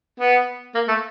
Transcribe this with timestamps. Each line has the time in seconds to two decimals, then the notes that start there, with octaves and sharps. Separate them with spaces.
0.19 B3
0.74 A#3
0.88 A3